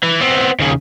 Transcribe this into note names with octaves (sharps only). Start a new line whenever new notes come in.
E3
B3 C4
D#2 C#3